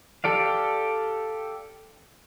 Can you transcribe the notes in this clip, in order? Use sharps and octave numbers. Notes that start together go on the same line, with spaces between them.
G4 A4 D5 F5